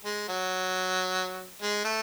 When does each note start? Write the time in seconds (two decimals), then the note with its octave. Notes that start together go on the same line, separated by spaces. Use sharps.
0.05 G#3
0.28 F#3
1.62 G#3
1.84 A3